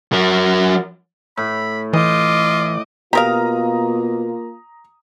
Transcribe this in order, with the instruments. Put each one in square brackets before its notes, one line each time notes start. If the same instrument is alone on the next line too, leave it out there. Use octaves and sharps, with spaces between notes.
[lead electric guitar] F#3 A#4
[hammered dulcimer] A2 [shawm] B5
[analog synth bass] E3 [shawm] F4 [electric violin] D#5 D6
[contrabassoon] B2 [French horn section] A#3 F4 [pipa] G4 A#4 F5 [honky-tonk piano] A#5 D#6